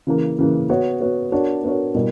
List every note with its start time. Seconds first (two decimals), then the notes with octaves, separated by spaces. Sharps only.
0.07 C#3 E3 A#3
0.39 C#3 E3 A#3
0.70 B3 F#4 C#5
1.01 B3 F#4 C#5
1.32 B3 D4 F#4 A#4 C#5
1.63 B3 D4 F#4 A#4 C#5
1.95 B2 G3 A#3 E4 A#4